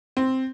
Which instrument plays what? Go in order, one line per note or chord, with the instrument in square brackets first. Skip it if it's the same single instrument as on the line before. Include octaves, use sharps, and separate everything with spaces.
[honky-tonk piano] C4